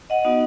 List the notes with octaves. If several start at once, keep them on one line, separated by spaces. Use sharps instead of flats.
D#5 F#5
B3 D#4 F#4